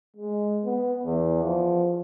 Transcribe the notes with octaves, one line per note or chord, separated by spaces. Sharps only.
G#3
B3
E2
F3